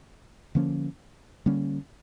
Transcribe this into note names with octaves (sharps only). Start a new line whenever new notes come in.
D3 F3 A#3 C#4
D3 G3 A#3 C#4